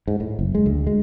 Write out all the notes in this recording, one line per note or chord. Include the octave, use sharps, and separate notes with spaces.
G#2
A2
F#1
G#3
D2
G#3